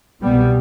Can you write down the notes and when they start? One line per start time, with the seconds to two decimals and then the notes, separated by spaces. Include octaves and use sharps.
0.22 C2 B2 G3 B3